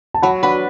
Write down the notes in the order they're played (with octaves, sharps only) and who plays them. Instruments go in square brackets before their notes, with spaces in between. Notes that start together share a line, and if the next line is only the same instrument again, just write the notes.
[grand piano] A5
[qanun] F#3 [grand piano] F#5 B5
[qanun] D4 B4 [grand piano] F#5 B5